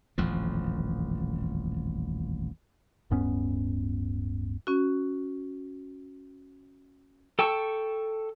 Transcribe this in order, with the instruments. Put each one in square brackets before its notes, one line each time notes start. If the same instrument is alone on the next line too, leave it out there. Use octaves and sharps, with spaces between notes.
[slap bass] D#1 A1 F2 F3
[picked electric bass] D1 G2 B3 C#4
[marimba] C#4 F#4
[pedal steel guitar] A4 G5 A5 C#6 E6